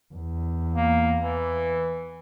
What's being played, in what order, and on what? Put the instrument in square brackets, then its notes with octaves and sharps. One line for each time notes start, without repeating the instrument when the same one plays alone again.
[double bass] E2
[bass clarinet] A#3
E3